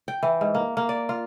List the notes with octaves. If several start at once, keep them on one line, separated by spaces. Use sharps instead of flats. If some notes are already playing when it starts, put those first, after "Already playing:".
G5
E3
G#2
A#3
A#3
D5
F4